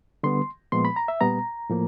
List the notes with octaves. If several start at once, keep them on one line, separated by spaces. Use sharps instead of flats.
D3 G3 B3 C6
A#2 F3 G#3 B3 C6
B5
A#5
E5
A#2 G3 B3 A#5
A2 F3 A#3